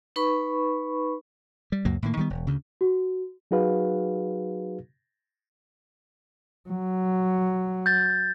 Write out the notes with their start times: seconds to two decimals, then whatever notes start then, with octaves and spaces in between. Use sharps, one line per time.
0.16 D#4 B4 B5 C#6
1.72 G3
1.85 C#2 F#2 F#3 A#3
2.02 A2 D#3 A#3
2.17 D#3 G3 B3
2.30 E1
2.47 D2 C#3
2.81 F#4
3.51 F#3 D#4 F#4 G#4 B4 F5
6.69 F#3
7.86 G6 A6